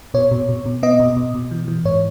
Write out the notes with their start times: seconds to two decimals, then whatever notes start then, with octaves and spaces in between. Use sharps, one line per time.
0.14 B2 C#5
0.31 B2
0.49 B2
0.66 B2
0.83 B3 D#5
1.00 B2
1.17 B2
1.34 B2
1.51 E3
1.68 E3
1.85 G#2 C#5